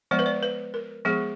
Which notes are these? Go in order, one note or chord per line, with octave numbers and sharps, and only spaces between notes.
F3 G#3 B3 D5
B4
D5
B4
A#4
F3 G#3 B3 G#4